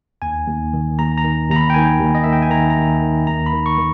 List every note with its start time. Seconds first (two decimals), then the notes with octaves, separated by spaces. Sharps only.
0.22 D#2 G#5
0.47 D#2
0.73 D#3
0.99 D#2 A#5
1.18 A#5
1.24 D#3
1.50 D#2 A#5
1.56 B5
1.70 G5
1.74 D#3 G#5
2.00 D#2
2.15 D#5
2.24 D#3 E5
2.33 G5
2.42 G#5
2.50 D#3 A#5
2.70 A#5
2.77 D#2
3.02 D#3
3.27 D#2 A#5
3.46 B5
3.53 D#3
3.66 C#6
3.78 D#3